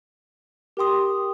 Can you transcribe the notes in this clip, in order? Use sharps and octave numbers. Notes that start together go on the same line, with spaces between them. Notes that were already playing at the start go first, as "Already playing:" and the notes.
G4 A#4 G5 C6 D#6